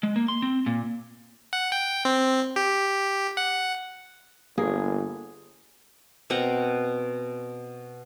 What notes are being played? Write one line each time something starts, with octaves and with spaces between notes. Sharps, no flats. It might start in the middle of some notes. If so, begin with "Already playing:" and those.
G#3
A#3
C6
C4
A#2
F#5
G5
C4
G4
F#5
G1 A#3 G#4
B2 C4 A#4 F#5